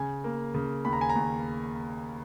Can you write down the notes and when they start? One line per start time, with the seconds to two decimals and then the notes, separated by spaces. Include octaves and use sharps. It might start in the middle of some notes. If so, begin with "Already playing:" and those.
Already playing: C#3 G#5
0.24 A#3
0.54 C#3
0.85 D#2 B5
0.93 A#5
1.01 G#5
1.09 A#5
1.15 D#2